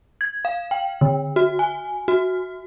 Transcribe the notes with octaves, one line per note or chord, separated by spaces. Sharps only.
G#6
F5
G5
D3
F#4
G#5
F#4